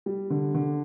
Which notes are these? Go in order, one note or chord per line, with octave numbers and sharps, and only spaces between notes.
G3
D3
D3